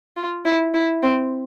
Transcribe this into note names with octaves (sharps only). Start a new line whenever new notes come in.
F4
E4
E4
C4